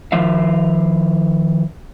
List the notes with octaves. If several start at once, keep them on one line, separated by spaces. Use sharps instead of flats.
D#3 F3 E5 F5